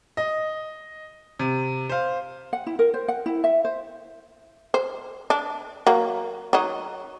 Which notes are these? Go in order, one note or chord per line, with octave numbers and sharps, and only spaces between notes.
D#5
C3
C5 F5
F#5
E4
A#4
C5
F#5
E4
E5
C5
C5
D4
F#3 A#3
F#3 D#4